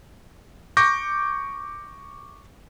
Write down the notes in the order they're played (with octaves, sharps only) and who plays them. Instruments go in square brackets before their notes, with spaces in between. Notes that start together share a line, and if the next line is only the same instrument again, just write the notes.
[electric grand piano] C#6 D6 G6 A#6